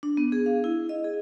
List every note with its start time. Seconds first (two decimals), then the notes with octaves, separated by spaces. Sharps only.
0.03 D4
0.17 B3
0.32 G#4
0.46 F5
0.64 E4
0.89 D#5
1.04 G#4